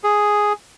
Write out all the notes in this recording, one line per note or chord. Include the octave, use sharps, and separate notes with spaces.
G#4